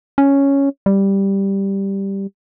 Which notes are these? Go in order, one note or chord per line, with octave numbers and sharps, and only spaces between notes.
C#4
G3